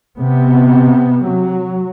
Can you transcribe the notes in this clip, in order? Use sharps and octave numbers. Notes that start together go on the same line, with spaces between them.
C3 B3
F#3